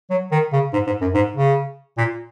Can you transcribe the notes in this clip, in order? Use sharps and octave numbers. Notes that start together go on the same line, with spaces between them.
F#3
D#3
C#3
G#2
G#2
F#2
G#2
C#3
A#2